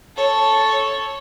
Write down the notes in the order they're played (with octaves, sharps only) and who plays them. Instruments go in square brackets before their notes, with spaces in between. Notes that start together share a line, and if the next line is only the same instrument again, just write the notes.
[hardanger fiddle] A4 C#5